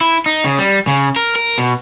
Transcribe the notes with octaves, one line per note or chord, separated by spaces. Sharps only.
E4
D#4
C#3
G3
C#3
A#4
A#4
B2